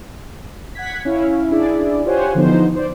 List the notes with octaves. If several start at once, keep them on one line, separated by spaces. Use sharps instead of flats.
F#5 G#6 B6
C#4 E4 F5
D4 E4 G#4 D5
F4 G4 C5 C#5 F#5 G#5
D3 E3 F3 B3 D#4 C5
C5 D5